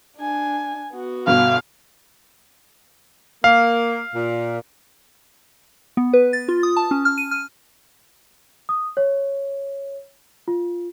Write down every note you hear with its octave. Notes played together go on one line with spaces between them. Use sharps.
D4 G#5
B3 F#4
G1 B2 F5
A#3 F5
A#2
B3
B4
A6
F4
D#6
A5
C#4
F6
D#7
F6
D#6
C#5
F4